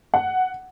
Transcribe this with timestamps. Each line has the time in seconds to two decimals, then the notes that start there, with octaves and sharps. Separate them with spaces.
0.14 F#5